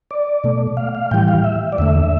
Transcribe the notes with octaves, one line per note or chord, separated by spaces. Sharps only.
D5
B2 A3
F5
F5
A2 E3 G3 G5
F5
E5
D5
E2 D3 A3 E5